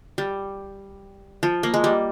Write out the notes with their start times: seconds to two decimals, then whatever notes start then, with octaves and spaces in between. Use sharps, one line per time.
0.18 G3
1.43 F3
1.63 A#3
1.74 G#3
1.84 G3